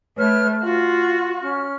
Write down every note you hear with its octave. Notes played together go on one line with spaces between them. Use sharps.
A3 B4 C#5 F6
F4 F#4
C#4 F6